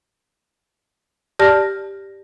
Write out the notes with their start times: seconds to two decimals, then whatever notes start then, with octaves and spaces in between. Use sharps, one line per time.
1.39 G4 D5 A5 F6 A#6